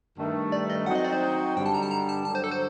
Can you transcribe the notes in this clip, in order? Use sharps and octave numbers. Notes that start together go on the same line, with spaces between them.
G2 D#3 A3
D5
D#5
F#3 C4 D#4 F#4 F#5
D#5
D5
C5
G2 D3 G3 G5
A5
A#5
A5
A#5
A5
G2 D3 F#3 A5
C5
A4
C5